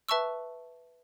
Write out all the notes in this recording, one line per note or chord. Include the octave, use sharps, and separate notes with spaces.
B4 E5 A5 C#6 E6